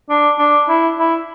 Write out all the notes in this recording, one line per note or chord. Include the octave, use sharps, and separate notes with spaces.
D4
D4
E4
E4